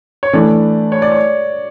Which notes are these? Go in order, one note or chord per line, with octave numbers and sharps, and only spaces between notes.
C#5
E3 A3 D4 D5
C#5
D5
C#5